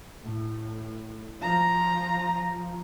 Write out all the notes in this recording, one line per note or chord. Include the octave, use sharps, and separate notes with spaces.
A2
F3 A#5